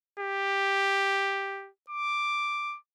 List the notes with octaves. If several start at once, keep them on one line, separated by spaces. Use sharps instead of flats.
G4
D6